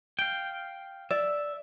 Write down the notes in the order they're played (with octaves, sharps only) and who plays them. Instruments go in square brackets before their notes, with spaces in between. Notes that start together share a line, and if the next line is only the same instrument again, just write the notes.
[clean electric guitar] F5 G5
[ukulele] D5 [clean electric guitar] E5